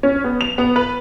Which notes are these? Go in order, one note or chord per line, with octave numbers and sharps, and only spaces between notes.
C#4
B3
F7
B3
B4